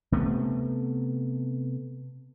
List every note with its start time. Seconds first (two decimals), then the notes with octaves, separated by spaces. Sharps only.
0.12 C3 A3 B3